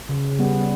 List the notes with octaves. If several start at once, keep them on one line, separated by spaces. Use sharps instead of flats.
C#3
G3 B3